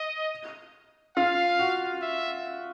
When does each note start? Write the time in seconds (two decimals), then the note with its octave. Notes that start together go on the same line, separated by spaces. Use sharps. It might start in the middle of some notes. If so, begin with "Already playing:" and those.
Already playing: D#5
1.17 F4 F5
1.59 F#4
2.02 E5